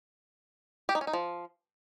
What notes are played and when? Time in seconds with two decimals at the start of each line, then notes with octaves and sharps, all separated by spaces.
0.89 G4
0.95 D#4
1.01 C#4
1.07 D#4
1.13 F3